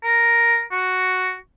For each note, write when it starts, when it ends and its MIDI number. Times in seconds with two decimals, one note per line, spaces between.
0.03 0.61 70
0.72 1.34 66